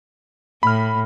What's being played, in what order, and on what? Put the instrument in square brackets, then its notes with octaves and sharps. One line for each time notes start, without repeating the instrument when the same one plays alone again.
[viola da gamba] A2 [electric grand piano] B5 F6